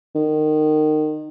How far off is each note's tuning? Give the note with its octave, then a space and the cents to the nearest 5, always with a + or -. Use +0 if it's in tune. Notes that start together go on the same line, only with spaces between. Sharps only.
D#3 -25